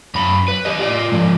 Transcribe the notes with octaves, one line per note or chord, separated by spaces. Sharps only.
F#2 B5
B4
G4 D#5
F4 D5
G#2 F3